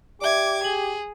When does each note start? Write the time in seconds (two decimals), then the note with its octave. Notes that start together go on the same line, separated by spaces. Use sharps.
0.21 G4 D5 E5 D6 G#6
0.64 G#4 F#7